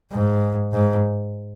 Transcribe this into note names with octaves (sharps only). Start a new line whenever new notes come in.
G#2
G#2